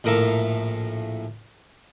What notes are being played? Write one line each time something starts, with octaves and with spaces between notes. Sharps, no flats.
A#1 A2 A#4 E5 F5